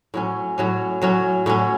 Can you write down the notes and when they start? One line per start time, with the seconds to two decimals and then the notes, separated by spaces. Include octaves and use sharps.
0.14 A2 F#3 C#4
0.58 A2 F#3 C#4
1.02 A2 F#3 C#4
1.46 A2 F#3 C#4